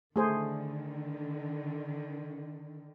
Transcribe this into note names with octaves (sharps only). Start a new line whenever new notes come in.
D3 D#3 A3 G#4 C5